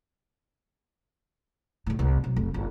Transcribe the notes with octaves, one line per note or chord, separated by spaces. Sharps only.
C#2 A2
C2
B1
F1
G1